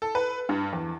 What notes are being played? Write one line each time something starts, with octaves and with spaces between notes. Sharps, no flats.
A4
B4
G2
E2